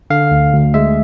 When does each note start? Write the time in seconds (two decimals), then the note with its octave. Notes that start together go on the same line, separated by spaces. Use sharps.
0.10 D3 F5
0.31 D2
0.53 D2
0.74 G#3 E5